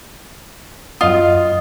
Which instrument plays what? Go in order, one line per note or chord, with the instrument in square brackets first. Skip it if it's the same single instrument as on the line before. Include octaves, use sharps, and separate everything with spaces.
[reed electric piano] F#2 D#5 D#6 [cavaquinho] F4